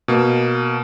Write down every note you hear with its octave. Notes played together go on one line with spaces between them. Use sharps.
B2 A#3